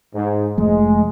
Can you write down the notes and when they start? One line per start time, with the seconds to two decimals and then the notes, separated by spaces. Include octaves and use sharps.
0.14 G#2
0.58 F1 F3 G#3 A3